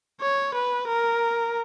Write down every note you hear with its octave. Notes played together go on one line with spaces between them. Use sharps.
C#5
B4
A#4